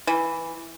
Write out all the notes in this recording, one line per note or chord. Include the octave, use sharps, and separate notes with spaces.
E3